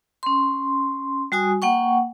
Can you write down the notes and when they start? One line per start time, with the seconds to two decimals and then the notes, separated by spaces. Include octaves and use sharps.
0.23 C#4 C6
1.32 G3 F#4 G#5 D#6
1.62 A#3 F#5 G5 C#6